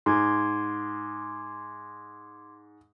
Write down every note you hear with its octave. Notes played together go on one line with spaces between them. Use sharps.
G#2 C6 D6 G#6